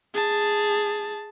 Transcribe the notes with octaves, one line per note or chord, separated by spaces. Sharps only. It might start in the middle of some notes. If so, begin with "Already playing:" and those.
G#4 A5